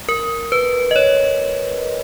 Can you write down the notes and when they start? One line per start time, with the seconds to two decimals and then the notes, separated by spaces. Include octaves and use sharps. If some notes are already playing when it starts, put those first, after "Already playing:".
0.09 A#4
0.52 B4
0.91 D#5
0.96 C#5